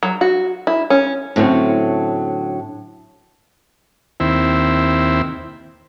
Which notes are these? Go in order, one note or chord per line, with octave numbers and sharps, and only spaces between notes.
F#3
F#4
E4
C#4
A2 D3 F#3 A3 C4 C#4
D#2 C4 E4